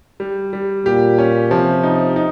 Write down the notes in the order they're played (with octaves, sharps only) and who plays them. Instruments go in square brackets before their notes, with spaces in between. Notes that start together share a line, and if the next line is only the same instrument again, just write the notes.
[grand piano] G3
G3
[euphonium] A#2 [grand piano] G4
[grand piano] C#4
[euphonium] C3 [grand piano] F3
[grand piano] D#4
D#4